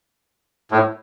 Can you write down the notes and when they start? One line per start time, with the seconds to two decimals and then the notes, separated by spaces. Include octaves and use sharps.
0.71 A2